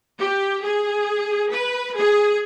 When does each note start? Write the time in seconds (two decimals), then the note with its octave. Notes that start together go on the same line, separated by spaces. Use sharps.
0.19 G4
0.63 G#4
1.51 B4
1.95 G#4